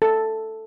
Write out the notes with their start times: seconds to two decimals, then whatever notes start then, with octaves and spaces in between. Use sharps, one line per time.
0.02 A4